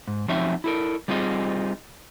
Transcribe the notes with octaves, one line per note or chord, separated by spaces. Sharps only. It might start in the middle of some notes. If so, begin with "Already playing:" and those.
G#2
F3 F#3 C4 C#4 D#4 E5
E4 A4 A#4
G3 C4 D#4 F4 G#4 D#5